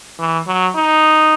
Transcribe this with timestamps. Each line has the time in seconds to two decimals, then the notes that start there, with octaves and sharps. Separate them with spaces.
0.19 E3
0.47 F#3
0.76 D#4